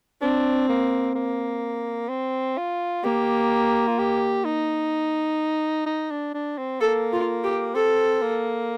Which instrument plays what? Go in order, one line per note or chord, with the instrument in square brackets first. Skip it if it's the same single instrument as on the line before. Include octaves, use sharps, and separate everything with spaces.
[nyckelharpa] C4 [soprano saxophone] D4
[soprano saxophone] A#3
A#3
C4
F4
[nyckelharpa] A#3 [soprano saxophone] G4
[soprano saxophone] F4
G4
D#4
D#4
D4
D4
C4
[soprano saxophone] A#3 [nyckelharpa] A4
[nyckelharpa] F4
G4
[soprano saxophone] C4 [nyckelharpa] A4
[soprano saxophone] A#3